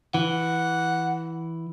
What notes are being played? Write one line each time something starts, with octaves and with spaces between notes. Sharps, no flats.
E3 F#5